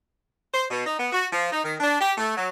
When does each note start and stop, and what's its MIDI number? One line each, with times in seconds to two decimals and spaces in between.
0.54 0.66 72
0.71 0.86 47
0.86 0.97 63
0.99 1.10 59
1.12 1.26 66
1.32 1.48 53
1.52 1.63 63
1.64 1.75 51
1.80 1.98 62
2.01 2.13 67
2.17 2.34 57
2.37 2.48 54